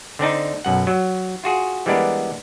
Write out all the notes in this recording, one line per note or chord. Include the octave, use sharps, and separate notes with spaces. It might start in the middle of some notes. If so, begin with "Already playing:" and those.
D3 C4 D4 D#4
B1 F#2 F#5
F#3
F4 F#4 G#4
E3 G3 G#3 B3 D4 A#4